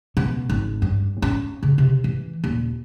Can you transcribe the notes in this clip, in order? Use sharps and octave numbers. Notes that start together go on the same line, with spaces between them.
B2
G#1
G2
C#4
C#3
C3
E3
D#1